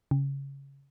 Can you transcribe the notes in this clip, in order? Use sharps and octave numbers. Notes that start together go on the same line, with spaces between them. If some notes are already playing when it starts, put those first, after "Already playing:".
C#3